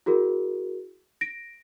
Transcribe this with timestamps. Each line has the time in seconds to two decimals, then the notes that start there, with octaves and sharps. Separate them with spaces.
0.06 E4 F#4 G#4 A#4
1.21 A#6 D7